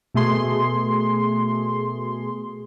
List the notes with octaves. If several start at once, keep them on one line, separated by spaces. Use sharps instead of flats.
B2 A3 G#4 C6